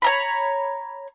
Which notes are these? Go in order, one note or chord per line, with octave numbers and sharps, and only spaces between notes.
C#5 A#5 B5